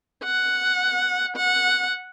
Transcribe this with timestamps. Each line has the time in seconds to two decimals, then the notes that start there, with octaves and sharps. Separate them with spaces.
0.24 F#5
1.36 F#5